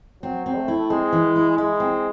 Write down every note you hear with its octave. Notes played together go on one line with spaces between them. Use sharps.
F#3 C4
C4
A3
E4
G#3 C4
E3
E4
G#3 E4
C4